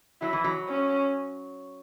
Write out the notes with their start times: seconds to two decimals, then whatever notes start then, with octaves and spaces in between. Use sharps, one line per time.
0.21 F#3 E4
0.33 E3
0.44 F#3
0.68 C#4